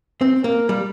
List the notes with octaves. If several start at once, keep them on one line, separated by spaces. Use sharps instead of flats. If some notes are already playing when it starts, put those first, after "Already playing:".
C4
A#3
G3